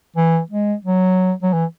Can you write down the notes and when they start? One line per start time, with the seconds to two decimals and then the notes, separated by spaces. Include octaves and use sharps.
0.16 E3
0.50 G#3
0.85 F#3
1.43 F#3
1.53 E3